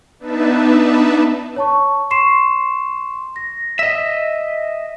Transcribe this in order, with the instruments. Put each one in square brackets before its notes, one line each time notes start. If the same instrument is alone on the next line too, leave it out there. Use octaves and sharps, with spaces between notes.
[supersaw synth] B3 D4 D#4 B4 E5 A5
[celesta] C#5 A5 C#6
C6 C#6 C7 E7
A#6
[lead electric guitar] D#5 E5